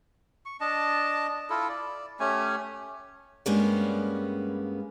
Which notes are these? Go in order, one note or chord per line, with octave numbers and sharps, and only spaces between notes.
C#6
D4 D#5 A5
E4 F4 A4
D5
A3 C#4 G4 G#5
G2 G3 G#3 A#3 B3 C#4